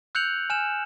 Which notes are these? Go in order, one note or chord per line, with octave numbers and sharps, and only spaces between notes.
E6 F#6 G6 C#7 F7 F#7
G#5 F6 E7